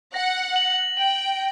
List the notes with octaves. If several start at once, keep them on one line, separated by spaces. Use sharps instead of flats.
F#5 A#6
F#7
G5 F#7